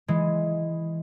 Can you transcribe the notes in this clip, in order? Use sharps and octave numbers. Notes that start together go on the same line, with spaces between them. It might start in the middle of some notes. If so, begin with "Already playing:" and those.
E3 G#3